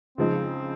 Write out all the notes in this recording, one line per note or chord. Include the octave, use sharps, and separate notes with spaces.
C#3 F3 G#3 C4 D#4